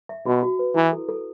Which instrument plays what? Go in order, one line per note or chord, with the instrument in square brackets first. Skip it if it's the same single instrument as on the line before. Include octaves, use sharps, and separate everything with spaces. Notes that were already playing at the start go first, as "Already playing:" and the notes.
[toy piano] E5
[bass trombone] B2 [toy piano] F#4
[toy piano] F#4
B4
[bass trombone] E3 [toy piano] E4
[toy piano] A4
A4